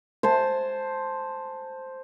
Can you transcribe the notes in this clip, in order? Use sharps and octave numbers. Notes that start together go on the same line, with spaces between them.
C5 G#5 A5